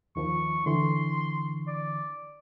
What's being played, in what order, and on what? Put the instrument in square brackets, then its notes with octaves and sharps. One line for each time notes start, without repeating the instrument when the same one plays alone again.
[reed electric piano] D#2 D#3 F3 [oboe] C#6
[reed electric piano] D3 E3 C#6 [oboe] C6
[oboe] D5